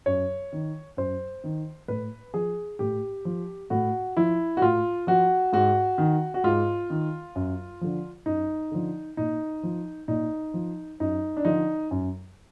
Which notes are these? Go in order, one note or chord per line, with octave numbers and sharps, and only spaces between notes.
F#2 C#5
D#3
F#2 C5
D#3
A2 B4
F3 G#4
A2 G4
F3
A2 F#4
F3 E4
F#4
A2 F4
F3 F#4
G#2 F#4
D#3
F#4
G#2 F4
D#3
F#2
D3 F3
F#2 D#4
D3 F3
A#2 D#4
F3
A#2 D#4
F3
F#2 D#4
D4
D3 F3 D#4
F#2